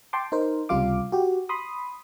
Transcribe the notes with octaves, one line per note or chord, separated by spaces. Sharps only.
G5 A5 C6 D6
D#4 A#4 C5
C#2 C3 G3 F4 F5 D6
F#4 G4
B5 C6 D#6